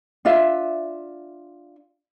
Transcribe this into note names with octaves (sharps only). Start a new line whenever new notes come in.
D4 F4 E5